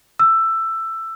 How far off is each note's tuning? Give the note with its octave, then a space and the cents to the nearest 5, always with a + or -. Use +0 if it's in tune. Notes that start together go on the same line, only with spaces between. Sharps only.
E6 +15